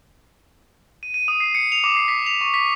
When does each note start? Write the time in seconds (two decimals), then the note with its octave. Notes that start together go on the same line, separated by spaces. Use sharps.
1.03 D#7
1.14 D#7
1.28 D#6
1.40 C7
1.55 C#7
1.72 F7
1.84 D6
1.97 C7
2.08 B6
2.26 F7
2.41 C#6
2.54 B6